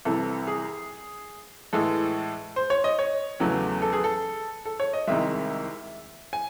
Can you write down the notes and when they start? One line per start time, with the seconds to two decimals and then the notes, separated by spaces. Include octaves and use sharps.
0.05 C2 C3 E3 A4
0.47 G#4
1.73 A2 E3 G#3 A4
2.56 C5
2.70 C#5
2.84 D#5
2.99 C#5
3.40 E2 C#3 F#3 A3
3.82 A4
3.93 G#4
4.04 A4
4.66 A4
4.80 C#5
4.93 D#5
5.07 C2 C3 D#3 G#3 E5
6.33 G#5